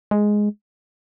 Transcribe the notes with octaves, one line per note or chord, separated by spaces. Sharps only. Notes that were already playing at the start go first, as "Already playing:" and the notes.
G#3